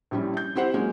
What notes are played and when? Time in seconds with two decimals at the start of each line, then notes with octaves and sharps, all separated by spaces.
0.11 A#1 G3 C#4 E4
0.37 G6
0.55 C4 E4 G4 C5 F#5
0.74 F#3 G#3 A#3 C#4